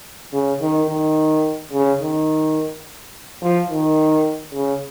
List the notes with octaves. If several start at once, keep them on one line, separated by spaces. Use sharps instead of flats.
C#3
D#3
D#3
C#3
D#3
F3
D#3
C#3